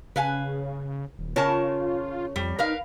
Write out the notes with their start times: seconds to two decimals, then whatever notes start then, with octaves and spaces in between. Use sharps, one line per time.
0.16 C#3 B4 F5 G#5
1.19 D#1
1.36 C#3 F4 A#4 C#5 A5
2.36 F2 G3
2.59 D#4 A#4 B4 F5